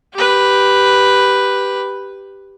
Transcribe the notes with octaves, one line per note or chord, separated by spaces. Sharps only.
G4 B4